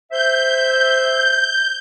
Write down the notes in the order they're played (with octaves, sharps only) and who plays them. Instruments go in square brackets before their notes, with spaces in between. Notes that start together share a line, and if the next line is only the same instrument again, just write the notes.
[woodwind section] C5 E5 [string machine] G6